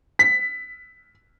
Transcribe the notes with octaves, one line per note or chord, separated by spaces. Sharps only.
B6